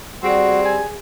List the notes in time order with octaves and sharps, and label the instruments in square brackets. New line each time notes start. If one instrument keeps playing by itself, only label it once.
[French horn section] G3 [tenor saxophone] C4 [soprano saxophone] F#4 [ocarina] G#4
[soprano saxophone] G#5